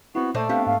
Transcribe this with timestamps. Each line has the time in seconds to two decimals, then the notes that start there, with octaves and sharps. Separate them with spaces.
0.15 B3 C4 E4 F#4
0.34 A#2 A3 D4 C5 D#5
0.49 B3 C4 D4 G4 F5
0.66 G#2 F5